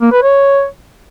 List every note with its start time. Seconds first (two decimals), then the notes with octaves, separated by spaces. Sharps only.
0.01 A#3
0.12 B4
0.23 C#5